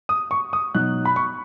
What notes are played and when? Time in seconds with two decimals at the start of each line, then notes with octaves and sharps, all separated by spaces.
0.09 D#6
0.31 C#6
0.53 D#6
0.75 B2 F#3 D#4 F#6
1.05 B5
1.16 C#6